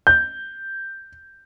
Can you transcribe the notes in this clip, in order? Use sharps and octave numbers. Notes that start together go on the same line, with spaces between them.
G6